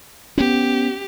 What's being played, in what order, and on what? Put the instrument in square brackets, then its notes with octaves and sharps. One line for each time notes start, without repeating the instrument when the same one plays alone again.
[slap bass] B3 C#4 [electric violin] G4